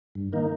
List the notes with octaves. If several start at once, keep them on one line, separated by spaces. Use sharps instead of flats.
G2
D#3 A#3 D#4